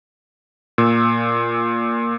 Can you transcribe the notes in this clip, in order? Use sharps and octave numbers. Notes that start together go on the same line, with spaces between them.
A#2 E6